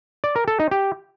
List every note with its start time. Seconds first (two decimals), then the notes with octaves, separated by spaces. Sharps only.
0.24 D5
0.36 A#4
0.48 A4
0.60 D#4
0.71 G4